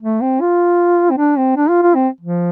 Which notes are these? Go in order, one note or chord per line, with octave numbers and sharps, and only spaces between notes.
A3
C4
F4
C4
D4
C4
D4
F4
F4
C4
F3